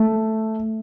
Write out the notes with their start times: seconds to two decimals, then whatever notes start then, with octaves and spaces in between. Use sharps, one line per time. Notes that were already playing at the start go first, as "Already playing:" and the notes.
Already playing: A3